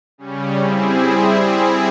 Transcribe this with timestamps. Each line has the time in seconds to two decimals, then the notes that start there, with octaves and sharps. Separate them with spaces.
0.18 C#3 G3 C#4
0.58 G3 C4 E4 G#4